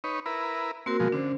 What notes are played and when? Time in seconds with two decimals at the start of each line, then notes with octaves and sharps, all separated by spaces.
0.04 D#4 B4 C#5
0.26 E4 A#4 B4
0.86 A#3 C4 F#4 A#4
1.00 B2 F3 G#3
1.12 D3 C#4 C5